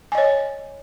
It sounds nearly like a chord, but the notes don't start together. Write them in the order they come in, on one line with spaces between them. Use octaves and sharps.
G#5 D#5 C#5